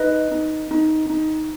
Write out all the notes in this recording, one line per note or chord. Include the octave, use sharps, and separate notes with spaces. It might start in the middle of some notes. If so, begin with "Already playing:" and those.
Already playing: D#4 B4 D#5
D#4
D#4
D#4